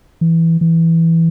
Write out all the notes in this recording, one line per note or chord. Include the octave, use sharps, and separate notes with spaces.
E3
E3